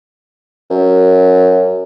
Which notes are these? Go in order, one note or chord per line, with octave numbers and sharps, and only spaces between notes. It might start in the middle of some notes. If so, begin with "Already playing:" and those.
F#2